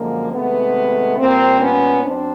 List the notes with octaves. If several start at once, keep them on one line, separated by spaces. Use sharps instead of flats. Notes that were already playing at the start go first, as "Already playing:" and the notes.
Already playing: F#2 D3 F3 G#3 A#3
C3 D#3 G#3 A3 B3
A#2 G3 A#3 C4
B3 C#4
F#2 C4 D4